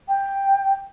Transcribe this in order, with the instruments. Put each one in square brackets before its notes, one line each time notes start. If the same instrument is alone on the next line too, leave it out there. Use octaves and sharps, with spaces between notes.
[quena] G5